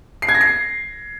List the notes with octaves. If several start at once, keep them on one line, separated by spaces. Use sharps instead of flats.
C7
G#6
A#6
C7